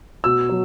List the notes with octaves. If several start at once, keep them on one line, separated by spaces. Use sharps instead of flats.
B2 E6
F#3